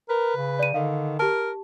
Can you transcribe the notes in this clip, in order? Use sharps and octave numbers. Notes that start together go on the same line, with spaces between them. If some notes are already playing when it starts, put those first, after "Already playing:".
A#4 B4
C#3
D5 D#7
D3 D#3 F5
G4 A#4 A5